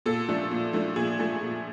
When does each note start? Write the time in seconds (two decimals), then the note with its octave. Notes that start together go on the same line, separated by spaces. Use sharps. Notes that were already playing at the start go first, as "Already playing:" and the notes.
0.06 A#2 A4
0.29 F3 A3 D4
0.51 A#2
0.73 F3 A3 D4
0.96 A#2 G#4
1.19 F3 A3 D4
1.41 A#2